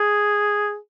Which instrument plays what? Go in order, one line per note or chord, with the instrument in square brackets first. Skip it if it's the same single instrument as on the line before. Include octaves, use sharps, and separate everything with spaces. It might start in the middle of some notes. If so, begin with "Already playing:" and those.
Already playing: [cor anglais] G#4